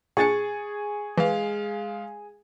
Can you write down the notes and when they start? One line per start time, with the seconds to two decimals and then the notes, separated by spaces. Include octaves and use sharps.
0.17 A#2 D4 G#4 C#6 A6 C#7
1.18 E3 G#3 F5